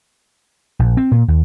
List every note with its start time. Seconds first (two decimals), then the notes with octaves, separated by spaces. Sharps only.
0.79 A#1
0.97 C4
1.11 A#2
1.28 D#2